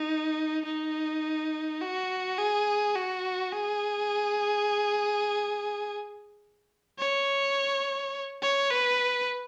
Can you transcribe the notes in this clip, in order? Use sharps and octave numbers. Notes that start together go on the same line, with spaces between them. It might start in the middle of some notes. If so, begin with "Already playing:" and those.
Already playing: D#4
D#4
F#4
G#4
F#4
G#4
C#5
C#5
B4